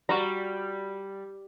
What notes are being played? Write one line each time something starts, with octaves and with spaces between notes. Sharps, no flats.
G3 F#4 A#5